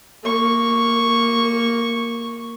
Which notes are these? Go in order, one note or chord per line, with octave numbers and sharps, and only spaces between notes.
A#3 C#6